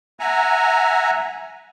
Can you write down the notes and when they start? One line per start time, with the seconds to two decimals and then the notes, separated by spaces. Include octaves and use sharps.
0.20 E5 F#5 G#5 A#5